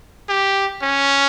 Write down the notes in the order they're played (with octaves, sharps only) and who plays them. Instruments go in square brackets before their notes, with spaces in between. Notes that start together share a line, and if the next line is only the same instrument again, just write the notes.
[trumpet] G4
C#4